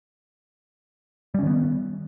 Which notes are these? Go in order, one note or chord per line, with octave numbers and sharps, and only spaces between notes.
D#3 G3 B3 C#4